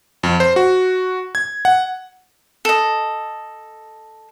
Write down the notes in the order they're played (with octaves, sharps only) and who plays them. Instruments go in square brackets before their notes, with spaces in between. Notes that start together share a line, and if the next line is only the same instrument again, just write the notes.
[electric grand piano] F2
C5
F#4
G#6
F#5
[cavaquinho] A4 D#5